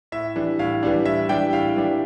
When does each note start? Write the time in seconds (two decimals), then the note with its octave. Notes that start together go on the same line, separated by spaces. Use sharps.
0.12 A2 E5
0.36 E3 G3 D4
0.59 A2 F5
0.83 E3 G3 D4
1.05 A2 E5
1.29 E3 G3 D4 G5
1.53 A2 F5
1.76 E3 G3 D4